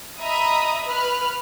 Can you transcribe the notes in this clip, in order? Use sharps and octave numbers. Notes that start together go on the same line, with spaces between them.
D#5 E5 A#5 B5 D#6
B4 B5 F6 F#6